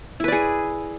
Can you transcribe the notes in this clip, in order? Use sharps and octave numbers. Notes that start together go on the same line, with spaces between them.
E4 G#4 B4 D5